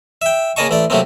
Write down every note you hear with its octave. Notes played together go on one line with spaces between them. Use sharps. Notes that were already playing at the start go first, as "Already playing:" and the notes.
E5 G5
C#3 A#3 G#4 D#5 A5 C#6
A1 A3 D5
C3 F#3 A3 A#3 C4